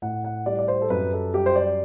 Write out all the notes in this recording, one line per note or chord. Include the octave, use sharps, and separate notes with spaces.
A2 F#5
F#5
G3 D5
D5
C5
A4
F#2 B4
A4
G3 G4
C5
D5